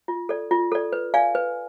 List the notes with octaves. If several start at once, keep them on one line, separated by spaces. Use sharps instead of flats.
F4
A4 D5
F4
A4 D5
B4
D5 F5 G#5
B4